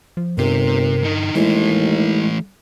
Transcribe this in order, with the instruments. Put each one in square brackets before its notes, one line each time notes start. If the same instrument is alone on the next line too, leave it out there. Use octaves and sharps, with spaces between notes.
[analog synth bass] F3
[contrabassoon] G1 [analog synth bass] G2 [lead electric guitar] C3 [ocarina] A#4
[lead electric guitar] D3 D#4
[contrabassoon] D#2 [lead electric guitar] E3 A3 [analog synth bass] G#3 [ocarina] E4